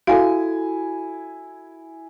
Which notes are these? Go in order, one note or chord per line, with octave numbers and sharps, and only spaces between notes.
E4 F#4 A4 F5 G#5